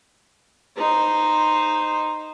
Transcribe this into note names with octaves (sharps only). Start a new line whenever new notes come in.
D#4 C5